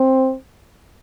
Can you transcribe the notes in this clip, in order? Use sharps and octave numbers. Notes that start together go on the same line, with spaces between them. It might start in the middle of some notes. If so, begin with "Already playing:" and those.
Already playing: C4